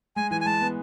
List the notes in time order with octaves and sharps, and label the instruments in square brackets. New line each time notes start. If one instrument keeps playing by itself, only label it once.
[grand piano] G#3 [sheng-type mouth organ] G#5
[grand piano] E3 [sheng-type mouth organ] G#5
[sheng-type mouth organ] G#5
[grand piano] G#3 [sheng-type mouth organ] A5
[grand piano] B3